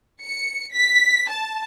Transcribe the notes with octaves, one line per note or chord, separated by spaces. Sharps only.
C#7
B6
A5